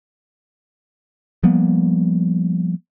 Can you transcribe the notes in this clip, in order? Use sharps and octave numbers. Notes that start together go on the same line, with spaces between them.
F3 G3 A#3 B3